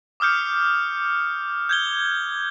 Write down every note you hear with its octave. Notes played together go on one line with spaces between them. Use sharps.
D6 D#6 F6 G6 C#7
G6 G#6 G7